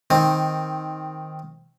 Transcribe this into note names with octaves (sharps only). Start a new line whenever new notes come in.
D#3 C4